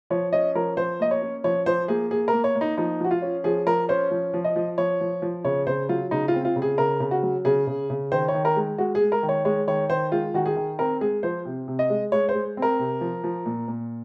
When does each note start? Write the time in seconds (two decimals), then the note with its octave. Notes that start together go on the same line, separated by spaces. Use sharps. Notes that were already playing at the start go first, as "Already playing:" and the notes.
0.10 F3 C#5
0.32 C#4 D#5
0.55 F3 A#4
0.77 F3 C5
1.00 A#3 D#5
1.11 C#5
1.22 C#4
1.44 F3 C#5
1.66 F3 C5
1.88 A#3 G#4
2.11 A#3 G#4
2.28 A#3 A#4
2.44 C#5
2.55 A#3
2.61 D#4
2.77 F3 D#4
3.00 F3 F#4
3.11 F4
3.22 C#4
3.44 F3 G#4
3.66 F3 A#4
3.89 C#4 C5
4.11 F3
4.34 F3
4.44 D#5
4.56 F3
4.78 F3 C#5
5.01 F3
5.22 F3
5.44 C#3 C#5
5.67 C#3 C5
5.89 F#3 F4
6.11 C#3 D#4
6.28 F4
6.34 C4
6.45 F4
6.56 C#3
6.62 G#4
6.78 C#3 A#4
7.00 C#3
7.11 F#4
7.23 F#3
7.45 C#3 G#4
7.67 C#3
7.90 C#3
8.12 D#3 C5
8.28 C#5
8.34 D#3
8.45 A#4
8.56 G#3
8.78 G#3 F#4
8.95 G#4
9.01 G#3
9.12 A#4
9.23 D#3
9.29 C#5
9.45 G#3 C#5
9.67 D#3 C#5
9.90 D#3 C5
10.12 G#3 F4
10.34 D#3 F#4
10.46 G#4
10.56 D#3
10.79 C4 A#4
11.01 G#3 G#4
11.23 F3 C5
11.45 C3
11.68 C3
11.79 D#5
11.90 G#3
12.12 G#3 C#5
12.29 C5
12.35 G#3
12.57 C4
12.62 A#4
12.79 C3
13.01 F3
13.24 F3
13.46 A#2
13.68 A#2